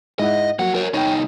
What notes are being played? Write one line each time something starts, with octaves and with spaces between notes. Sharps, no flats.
G#2 E4 D#5 F#5
F3 F#3 A#3 F#4 F#5
A#4 C#5
C2 D#4 C#5 G5